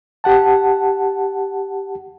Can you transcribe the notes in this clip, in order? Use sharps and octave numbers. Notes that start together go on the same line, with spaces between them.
G4 F#5 A5